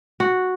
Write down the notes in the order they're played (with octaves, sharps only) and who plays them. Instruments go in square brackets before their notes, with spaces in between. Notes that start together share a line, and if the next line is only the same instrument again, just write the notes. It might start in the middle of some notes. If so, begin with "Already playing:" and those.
[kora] F#4